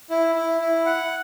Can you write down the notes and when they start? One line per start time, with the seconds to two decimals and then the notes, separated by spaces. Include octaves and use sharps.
0.10 E4
0.35 E4
0.61 E4
0.86 F#5